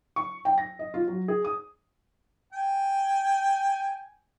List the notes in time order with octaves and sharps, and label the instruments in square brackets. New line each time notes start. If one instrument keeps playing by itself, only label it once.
[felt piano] C#6
G5
A#6
D#5
F4
F#3
G#4
D#6
[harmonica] G5 G#5